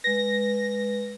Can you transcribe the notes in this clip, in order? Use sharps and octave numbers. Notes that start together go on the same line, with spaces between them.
G#3 B4 A#6